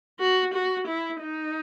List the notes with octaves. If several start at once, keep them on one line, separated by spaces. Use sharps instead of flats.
F#4
F#4
E4
D#4